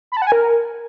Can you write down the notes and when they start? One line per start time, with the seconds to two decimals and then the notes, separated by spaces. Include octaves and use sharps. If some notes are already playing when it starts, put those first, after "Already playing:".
0.12 B5
0.17 A5
0.22 F#5
0.27 G#5
0.32 A#4